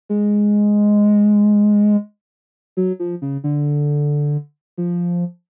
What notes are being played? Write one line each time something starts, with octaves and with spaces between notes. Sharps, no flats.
G#3
F#3
F3
C#3
D3
F3